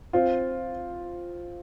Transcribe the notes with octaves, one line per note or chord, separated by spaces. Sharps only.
C4 F4